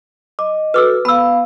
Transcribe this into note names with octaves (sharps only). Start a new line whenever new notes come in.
D#5 D6
F#4 A4 B4 D6 E6
B3 F5 B5 E6